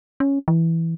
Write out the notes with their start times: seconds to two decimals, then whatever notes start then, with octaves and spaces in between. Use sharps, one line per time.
0.20 C#4
0.48 E3